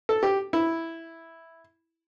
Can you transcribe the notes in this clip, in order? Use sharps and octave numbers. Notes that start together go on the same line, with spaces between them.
A4
G4
E4